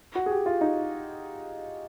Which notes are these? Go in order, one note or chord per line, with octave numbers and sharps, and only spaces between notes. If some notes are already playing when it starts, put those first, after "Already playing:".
F#4
G#4
G4
F4
D#4